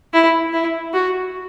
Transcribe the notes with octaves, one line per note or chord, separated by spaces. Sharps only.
E4
E4
F#4